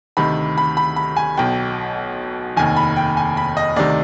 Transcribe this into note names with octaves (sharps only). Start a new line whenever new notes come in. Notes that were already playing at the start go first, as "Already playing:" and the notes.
D2 C3 D#3 B5
B5
B5
B5
G#5
B1 B2 G5
F1 D#2 D#3 G#5
B5
G5
G#5
B5
D#5
D2 C3 D#3 D5